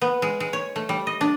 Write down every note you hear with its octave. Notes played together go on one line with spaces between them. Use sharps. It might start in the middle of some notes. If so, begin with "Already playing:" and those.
B3
G#3
G#3
C#5
A3
G3
D#5
D4